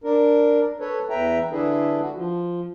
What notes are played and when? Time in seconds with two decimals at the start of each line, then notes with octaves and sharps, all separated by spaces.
0.04 D4 A#4
0.80 A4 B4 C#5
1.10 E2 B4 E5 G5 A#5
1.51 D3 D4 E4 G#4 A4 B4
2.01 F#4
2.15 F3